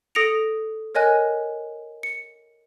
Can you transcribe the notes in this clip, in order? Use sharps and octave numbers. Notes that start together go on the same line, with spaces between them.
A4 D#6 A#6 C#7 D7 F7
A#4 C#5 D#5 G#5 F#6
C#7